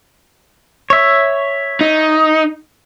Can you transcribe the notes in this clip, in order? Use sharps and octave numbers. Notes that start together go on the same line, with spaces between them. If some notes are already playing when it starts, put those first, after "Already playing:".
C#5 E5
D#4